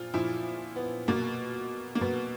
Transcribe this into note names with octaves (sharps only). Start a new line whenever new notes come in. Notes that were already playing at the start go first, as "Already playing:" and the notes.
Already playing: A#2 F3 F4
A#2 F3 E4
B3
B2 A#3
A#3
B2 B3